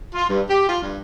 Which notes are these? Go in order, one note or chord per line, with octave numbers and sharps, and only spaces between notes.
F4
G2
G4
F4
G2